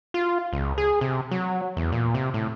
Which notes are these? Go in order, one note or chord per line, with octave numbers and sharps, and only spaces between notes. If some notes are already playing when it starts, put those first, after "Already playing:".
F4
C#2
G#4
C3
F#3
E2
A#2
C3
A2